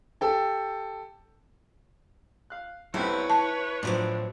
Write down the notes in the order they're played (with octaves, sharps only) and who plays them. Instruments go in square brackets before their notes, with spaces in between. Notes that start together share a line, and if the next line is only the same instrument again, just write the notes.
[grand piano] G4 A4 G5 A5
[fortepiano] F5 F#6
[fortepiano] B1 G3 C4 [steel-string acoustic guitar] E4 [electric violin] B4 C#5
[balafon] A5 [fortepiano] C#6
[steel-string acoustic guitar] A2 F#3 C4 [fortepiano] F3 D4